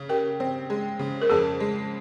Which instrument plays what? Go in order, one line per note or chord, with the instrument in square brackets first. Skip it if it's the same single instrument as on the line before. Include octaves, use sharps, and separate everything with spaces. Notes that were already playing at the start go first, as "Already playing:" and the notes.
Already playing: [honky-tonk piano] C#3
[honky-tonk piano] G4 [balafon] A#4
[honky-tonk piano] C4
G#3
C#3
[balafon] A#4
[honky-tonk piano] F2 [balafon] G#4
[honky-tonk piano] G#3